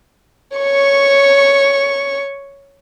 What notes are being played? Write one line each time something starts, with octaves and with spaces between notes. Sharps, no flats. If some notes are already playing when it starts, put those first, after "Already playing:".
C#5 C#6